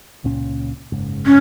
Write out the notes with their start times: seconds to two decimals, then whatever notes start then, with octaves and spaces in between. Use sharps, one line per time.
0.24 C#2 A#2 C#4
0.92 F#1 G#2 C#3
1.26 C#4